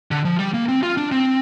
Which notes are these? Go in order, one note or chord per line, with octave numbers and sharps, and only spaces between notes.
D3
F3
G3
A#3
C4
F4
D4
C4